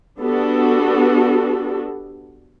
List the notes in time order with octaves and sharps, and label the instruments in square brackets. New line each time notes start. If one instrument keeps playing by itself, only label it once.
[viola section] B3 D4 F#4 G4 A4